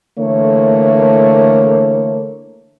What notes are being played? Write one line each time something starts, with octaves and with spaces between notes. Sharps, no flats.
D3 E3 A3 A#3 A4 C#5